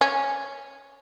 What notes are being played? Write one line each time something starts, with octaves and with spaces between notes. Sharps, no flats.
C#4